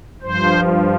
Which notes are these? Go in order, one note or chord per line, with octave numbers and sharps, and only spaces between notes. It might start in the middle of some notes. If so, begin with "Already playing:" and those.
G2 F3 C5